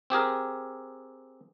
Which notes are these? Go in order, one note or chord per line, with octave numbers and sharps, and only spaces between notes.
C4 G4 G#4 A#4